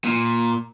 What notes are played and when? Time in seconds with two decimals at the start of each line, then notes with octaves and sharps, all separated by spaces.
0.05 A#2